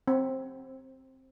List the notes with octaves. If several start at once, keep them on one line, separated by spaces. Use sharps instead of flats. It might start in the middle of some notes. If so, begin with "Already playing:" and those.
C4